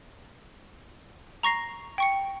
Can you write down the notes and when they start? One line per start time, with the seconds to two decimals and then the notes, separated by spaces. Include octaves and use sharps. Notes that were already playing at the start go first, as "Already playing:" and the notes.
1.43 A#5 C#6 A#6 C7
1.98 G5 C#6 C#7